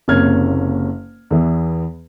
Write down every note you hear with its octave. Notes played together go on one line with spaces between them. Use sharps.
F#1 C3 A#3 C#4 F6 G#6
E2 E3